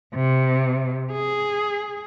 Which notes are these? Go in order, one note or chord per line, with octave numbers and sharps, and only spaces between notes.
C3
G#4